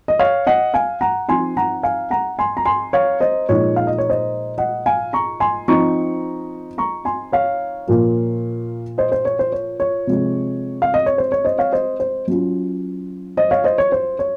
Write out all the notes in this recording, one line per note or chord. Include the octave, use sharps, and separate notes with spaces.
D#5
C#5 F5
D#5 F#5
F5 G#5
F#5 A#5
F3 C4 D#4 G#5 C6
F#5 A#5
F5 G#5
F#5 A#5
G#5 C6
A#5
G#5 C6
C#5 F5
C5 D#5
A#2 F3 G#3 D#4 C#5
F5
D#5
C#5
C5 D#5
D#5 F#5
F5 G#5
A#5 C#6
G#5 C6
F3 C4 D#4 A#5 C#6
A#5 C#6
G#5 C6
C#5 F5
A#2 F3 A#3
C5 D#5
C5
C#5
C5
C#5
C#5
C3 F3 G#3
F5
D#5
C#5
C5
C#5
C5 D#5
C#5 F5
C5 D#5
C5
F#3 C#4 F4
C5 D#5
C#5 F5
C5 D#5
C#5
C5
C#5